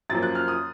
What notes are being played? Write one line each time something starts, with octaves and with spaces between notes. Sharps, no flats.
F#2 F3 A#3 A6
F#6
F6
D#6